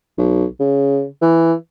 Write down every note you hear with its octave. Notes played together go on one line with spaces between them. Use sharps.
B1
C#3
E3